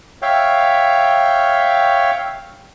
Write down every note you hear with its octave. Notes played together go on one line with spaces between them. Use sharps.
C#5 E5 F5 G5